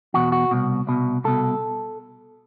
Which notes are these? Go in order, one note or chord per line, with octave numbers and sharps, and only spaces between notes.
E2 B2 F#4
F#4
C2 B2
C2 B2
C2 B2 A4